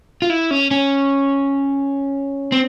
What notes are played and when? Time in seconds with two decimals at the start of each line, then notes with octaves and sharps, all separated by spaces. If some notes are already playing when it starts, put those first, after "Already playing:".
0.22 F4
0.30 E4
0.51 C#4
0.71 C#4
2.52 C4